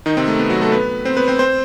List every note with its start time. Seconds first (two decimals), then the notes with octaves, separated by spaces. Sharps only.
0.06 D#3 D#4
0.17 C3 C4
0.28 A3
0.39 B3
0.50 F#3 F#4
0.61 A3 A4
0.72 B3 B4
1.05 C4 C5
1.17 B3 B4
1.28 C4 C5
1.39 C4 C5